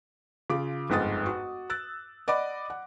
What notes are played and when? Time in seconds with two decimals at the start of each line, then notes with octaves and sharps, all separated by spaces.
0.50 C#3 F4 D6
0.90 G1 F2 G#2 F#5 D#6 A6
1.26 F#4
1.70 E6 F#6 A6
2.28 D5 D#5 F#5 B5 D6
2.70 F#5